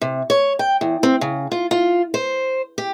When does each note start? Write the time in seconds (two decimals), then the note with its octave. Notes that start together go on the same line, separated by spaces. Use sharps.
0.02 C3
0.30 C#5
0.59 G5
0.81 E2
1.03 C4
1.21 C#3
1.52 F4
1.71 F4
2.14 C5
2.78 G4